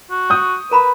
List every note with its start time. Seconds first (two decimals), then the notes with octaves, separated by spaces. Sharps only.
0.11 F#4
0.30 C#6 D#6 G6
0.71 A#4 B4 A#5 B5